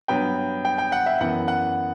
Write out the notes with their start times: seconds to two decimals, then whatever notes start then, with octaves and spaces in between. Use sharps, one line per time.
0.08 G2 F#3 B3 G5
0.65 G5
0.78 G5
0.92 F#5
1.06 E5
1.21 F#2 E3 B3 F#5
1.48 F#5